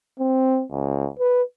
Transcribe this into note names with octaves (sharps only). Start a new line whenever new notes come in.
C4
C#2
B4